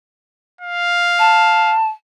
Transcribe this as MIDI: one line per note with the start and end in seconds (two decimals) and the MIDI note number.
0.61 1.76 77
1.19 1.88 81